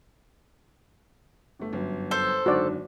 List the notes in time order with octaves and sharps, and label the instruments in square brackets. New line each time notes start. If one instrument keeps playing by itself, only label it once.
[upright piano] G1 A3
G1 F#2
[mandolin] A4 C5
[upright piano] F#1 G#2 D3 [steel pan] F#4 D5